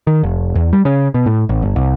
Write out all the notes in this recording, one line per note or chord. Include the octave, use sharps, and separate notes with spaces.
D#3
F1
E2
G3
C#3
B2
A2
A1
G1
C2